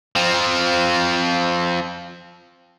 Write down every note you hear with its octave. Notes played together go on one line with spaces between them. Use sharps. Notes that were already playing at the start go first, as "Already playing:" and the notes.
F3 C4